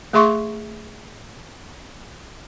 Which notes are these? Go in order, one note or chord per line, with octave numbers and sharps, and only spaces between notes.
A3 G#4 E5 C6 C#6